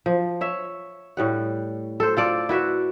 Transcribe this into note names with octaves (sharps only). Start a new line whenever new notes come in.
F3
C#5 E5
A2 G3 F#5
A4 C5
F4 A4 D5
E4 F#4 B4 E5